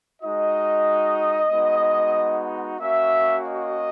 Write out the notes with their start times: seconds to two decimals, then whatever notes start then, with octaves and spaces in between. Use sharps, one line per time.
0.22 G#3 D#4 F#4 D#5
1.51 G#3 B3 D#4 F#4
2.79 A#3 C#4 F#4 E5
3.45 D#5